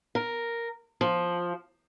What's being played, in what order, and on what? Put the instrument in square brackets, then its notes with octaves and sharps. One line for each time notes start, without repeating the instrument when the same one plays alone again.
[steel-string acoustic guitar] A#4
F3